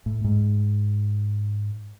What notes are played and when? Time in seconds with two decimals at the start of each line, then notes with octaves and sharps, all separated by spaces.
0.06 A2
0.24 G#2